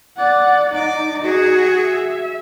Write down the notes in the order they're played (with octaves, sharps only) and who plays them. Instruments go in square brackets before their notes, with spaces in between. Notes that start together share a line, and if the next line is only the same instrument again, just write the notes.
[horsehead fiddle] D5 F#5
[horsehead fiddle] D#4 [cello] D5
[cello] F#4 G#4
[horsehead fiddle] E5